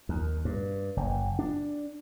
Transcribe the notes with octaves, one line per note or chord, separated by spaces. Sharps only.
D#2
G2
F#1
D4